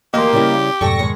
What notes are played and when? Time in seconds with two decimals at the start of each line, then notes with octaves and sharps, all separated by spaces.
0.14 D2 E3 A#3 G4 D#5 C6
0.33 C#3 G3 E4
0.81 F2 G#2 B2 G3 A4 G5 C#6 A#6
0.99 A2 D#3 G#3